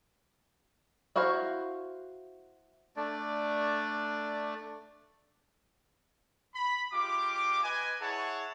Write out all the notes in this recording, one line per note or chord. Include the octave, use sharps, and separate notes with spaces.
E4 F#4 C5 F5 A#5
A3 D4 D5
B5
G#3 F4 G4 D6
B4 D#5 G#5
E4 G#4 C#5 F#5 A5